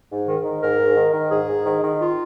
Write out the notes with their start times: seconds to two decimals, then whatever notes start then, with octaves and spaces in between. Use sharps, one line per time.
0.10 G#2
0.27 D#3
0.44 D#3
0.62 G#2 A#4
0.79 G#2
0.96 D#3
1.13 D#3
1.31 G#2 G#4
1.49 G#2
1.66 D#3
1.83 D#3
2.01 F4